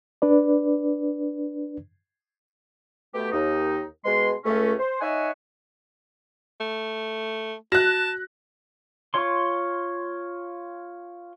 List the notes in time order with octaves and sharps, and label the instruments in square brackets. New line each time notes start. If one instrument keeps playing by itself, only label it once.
[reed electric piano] D4 B4 D5
[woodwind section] B2 A3 G4
D#2 D#4
B2 G#3 C6
C#2 A3 C#4
C5
D#4 C#5 D#5 E5 F#5 G#5
[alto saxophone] A3
[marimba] F#4 [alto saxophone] A5 [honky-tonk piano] F#6 A#6
[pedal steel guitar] F4 C#5 C6